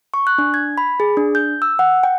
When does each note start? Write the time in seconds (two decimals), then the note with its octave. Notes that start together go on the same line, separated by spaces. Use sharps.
0.14 C#6
0.27 F#6
0.38 D4
0.54 G#6
0.78 B5
1.00 G#4
1.17 D4
1.35 G6
1.62 E6
1.79 F#5
2.03 G5